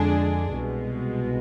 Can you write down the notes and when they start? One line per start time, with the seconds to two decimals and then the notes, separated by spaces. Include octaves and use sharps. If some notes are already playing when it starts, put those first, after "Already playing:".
Already playing: F2 D3 G#3 D4 G#4
0.52 C2 B2 G#3